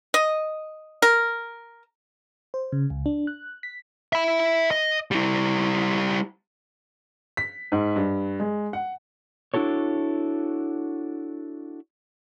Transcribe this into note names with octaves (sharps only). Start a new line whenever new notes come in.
D#5
A#4
C5
C#3
C#2
D4
F#6
B6
E5 B5
D#5
G3 E4
B6
G#2
G2
G#3
F#5
D4 E4 F#4 A4 C#5